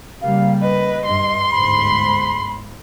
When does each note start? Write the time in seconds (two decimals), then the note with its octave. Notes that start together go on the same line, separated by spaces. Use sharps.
0.22 C#3 G3 A#3 F5
0.61 B4 D#5
1.05 G2 C6
1.51 G1 D2 G#2 B5